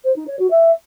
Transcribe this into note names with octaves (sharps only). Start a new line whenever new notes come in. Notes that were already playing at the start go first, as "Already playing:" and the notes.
C5
D#4
C#5
F#4
E5